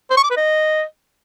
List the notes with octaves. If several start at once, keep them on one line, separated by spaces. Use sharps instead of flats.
C5
C#6
D6
B4
D#5